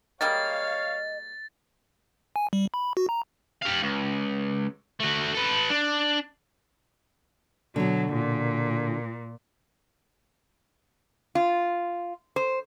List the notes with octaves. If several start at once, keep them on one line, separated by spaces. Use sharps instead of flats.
G3 G#3 A#3 C#5 D#5 F5 A6
G#5
G3
B5
F#4
A#5
G4 F5
C#2
A3 F#4
A4 B4
D4
B2 D3 F#3
A#2
F4
C5